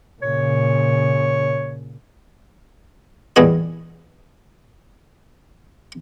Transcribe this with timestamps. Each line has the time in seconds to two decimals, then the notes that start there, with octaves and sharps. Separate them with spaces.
0.22 A#2 C#3 C#5
3.36 E2 A#2 G3 B3 G#4 D#5